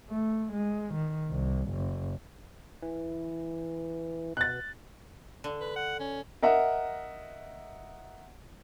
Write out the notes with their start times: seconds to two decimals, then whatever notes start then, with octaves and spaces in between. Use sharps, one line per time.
0.10 A3
0.53 G#3
0.94 D#3
1.30 C2
1.71 F#1
2.82 E3
4.37 B2 F#6 A6
5.44 D3
5.61 B4
5.76 F#5
6.00 C#4
6.42 A#4 D#5 E5 F#5